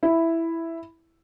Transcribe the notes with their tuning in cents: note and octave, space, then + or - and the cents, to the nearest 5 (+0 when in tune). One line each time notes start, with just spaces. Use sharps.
E4 +5